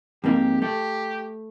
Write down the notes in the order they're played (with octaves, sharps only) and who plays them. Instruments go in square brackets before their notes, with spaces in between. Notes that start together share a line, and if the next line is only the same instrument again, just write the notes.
[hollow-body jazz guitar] F2 G#2 A#3 [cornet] G4
[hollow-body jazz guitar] A3 [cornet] G4